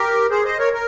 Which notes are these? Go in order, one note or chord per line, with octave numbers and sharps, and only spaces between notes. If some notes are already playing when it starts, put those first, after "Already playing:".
Already playing: G4 A#4
G#4 C5
C5 D#5
A#4 C#5
A#4